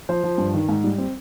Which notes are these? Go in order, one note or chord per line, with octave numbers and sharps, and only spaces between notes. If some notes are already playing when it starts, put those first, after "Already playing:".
F3 C5
F3
G2
D#3
G#2
G3
C4